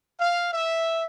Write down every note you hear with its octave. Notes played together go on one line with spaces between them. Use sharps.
F5
E5